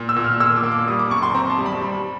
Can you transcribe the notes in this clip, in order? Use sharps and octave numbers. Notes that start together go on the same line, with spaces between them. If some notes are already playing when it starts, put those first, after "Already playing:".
Already playing: A#2
E6
A#2
F6
A#2 E6
D6
A#3
D6
G3 D#6
D6
F#2 C#6
C6
C4 A#5
A5
G3
B5
G3